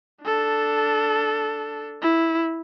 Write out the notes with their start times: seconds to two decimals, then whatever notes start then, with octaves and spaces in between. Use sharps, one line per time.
0.24 D4 A4
2.02 E4